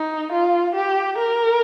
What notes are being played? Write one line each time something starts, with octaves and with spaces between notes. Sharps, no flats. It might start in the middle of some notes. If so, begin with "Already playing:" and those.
Already playing: D#4
F4
G4
A#4